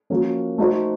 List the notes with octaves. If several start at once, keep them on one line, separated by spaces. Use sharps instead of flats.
F3 A#3 C#4 F#4 A#4
A3 D#4 F#4 C5